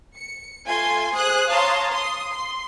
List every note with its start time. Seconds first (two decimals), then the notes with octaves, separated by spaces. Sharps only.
0.16 C#7
0.65 A3 F4 G#5 C6
1.14 G#4 C5 D#6 F#6
1.49 C#5 F5 A5 A#5 C6 D#6
1.90 C6 D#6
2.30 C6